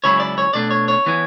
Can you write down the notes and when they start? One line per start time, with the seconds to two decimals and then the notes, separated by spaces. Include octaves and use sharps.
0.04 C#2 C#3 F#3 C#4 E4 C#5
0.20 D5
0.38 C#5
0.54 B2 A3 D4 D5
0.71 C#5
0.88 C#5
1.06 E3 B3 E4